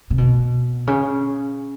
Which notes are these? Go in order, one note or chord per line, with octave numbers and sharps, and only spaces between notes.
C3
B2
C#3